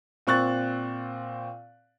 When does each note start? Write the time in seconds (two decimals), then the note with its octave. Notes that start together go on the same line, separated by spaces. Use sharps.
0.27 A#2 C4 C#6 F#6 A6